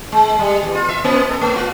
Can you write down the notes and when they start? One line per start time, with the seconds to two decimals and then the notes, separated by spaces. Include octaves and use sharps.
0.12 G#3
0.39 G3
0.63 E2
0.75 F4
0.89 E5
1.04 A#3
1.29 A4
1.41 A3
1.56 F4